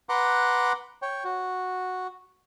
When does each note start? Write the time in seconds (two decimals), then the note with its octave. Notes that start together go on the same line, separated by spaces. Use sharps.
0.09 B4 F#5 A#5 C6 D6 F#6
1.02 C#5 G5
1.24 F#4